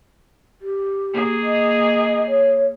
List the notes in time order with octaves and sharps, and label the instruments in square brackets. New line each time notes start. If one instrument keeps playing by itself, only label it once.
[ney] G4
[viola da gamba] A#3 G#4
[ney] D#5
C#5